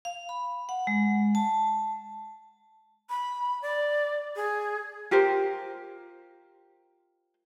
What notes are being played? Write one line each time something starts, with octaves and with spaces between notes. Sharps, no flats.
F5
B5
F#5
G#3
A5
B5
D5
G#4
F4 G4 A#4 C5